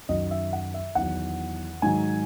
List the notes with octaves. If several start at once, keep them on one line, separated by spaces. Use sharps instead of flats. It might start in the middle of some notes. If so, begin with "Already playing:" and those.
F#2 D#3 F#3 D#5
E5
F#5
E5
E2 D#3 F#3 F#5
G#2 D#3 F#3 G#5